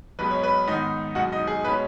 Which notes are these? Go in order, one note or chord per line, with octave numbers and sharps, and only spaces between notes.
B1 B2 G#3 B4
C#5
B4
G#2 D#3 B3 D#4 D#5
B1 B2 G#3 F#4 F#5
D#4 D#5
G#4
B2 G#3 C#4 B4